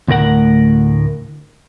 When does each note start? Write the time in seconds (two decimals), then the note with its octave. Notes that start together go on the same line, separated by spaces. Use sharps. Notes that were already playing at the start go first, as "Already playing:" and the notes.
0.08 D2 A2 A#4 F#5